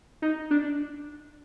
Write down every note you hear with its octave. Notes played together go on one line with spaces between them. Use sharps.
D#4
D4